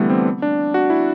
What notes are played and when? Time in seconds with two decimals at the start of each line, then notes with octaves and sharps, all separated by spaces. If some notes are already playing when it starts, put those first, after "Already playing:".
Already playing: D3 E3 G3 A3 B3
0.10 C4
0.42 D4
0.74 F#4
0.90 E4